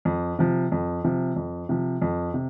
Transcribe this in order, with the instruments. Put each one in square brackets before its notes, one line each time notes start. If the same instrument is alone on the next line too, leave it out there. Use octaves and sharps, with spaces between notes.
[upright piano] F2
C3 F3
F2
C3 F3
F2
C3 F3
F2
C3